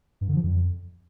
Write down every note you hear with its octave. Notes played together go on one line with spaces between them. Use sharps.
G2
D3
F3
F2